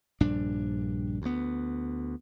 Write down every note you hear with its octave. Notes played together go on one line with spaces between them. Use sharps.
A#1 G2 D4
D2 B3